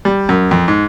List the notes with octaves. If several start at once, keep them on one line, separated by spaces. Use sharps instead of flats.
G3
F#2
F2
G#2